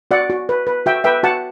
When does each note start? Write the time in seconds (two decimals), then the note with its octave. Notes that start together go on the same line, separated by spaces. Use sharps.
0.11 F#4 D5 F#5
0.30 F#4
0.49 B4
0.67 B4
0.86 F#4 E5 G5
1.04 B4 E5 G5
1.23 F#4 F#5 A5